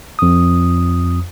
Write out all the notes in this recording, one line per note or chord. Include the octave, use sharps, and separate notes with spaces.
F2 D#6